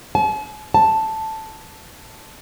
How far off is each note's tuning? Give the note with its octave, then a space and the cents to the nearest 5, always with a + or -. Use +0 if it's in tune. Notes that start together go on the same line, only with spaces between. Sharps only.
A5 -45
A5 +0